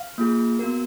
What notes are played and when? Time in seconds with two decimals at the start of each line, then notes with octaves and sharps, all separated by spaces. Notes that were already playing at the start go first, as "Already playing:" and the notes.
Already playing: F5
0.18 A#3 F4 G#4
0.59 B3 F#4 A#4